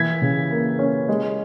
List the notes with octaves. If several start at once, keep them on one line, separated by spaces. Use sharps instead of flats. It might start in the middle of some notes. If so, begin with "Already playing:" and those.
Already playing: E3 G#6 B6
C#3
A#3
C#4
G#3